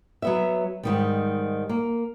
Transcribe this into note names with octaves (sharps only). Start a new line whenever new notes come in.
F#3 B3 E5
G#2 D#3 G3
A#3